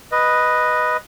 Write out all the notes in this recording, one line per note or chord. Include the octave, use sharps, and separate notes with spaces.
B4 D#5